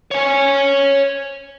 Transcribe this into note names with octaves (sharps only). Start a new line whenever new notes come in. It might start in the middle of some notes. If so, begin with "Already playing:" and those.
C#5 G#5